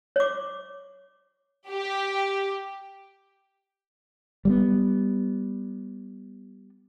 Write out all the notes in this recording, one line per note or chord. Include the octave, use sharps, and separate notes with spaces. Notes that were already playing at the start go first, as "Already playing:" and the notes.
C#5 D6
G4
G3 G#3 B3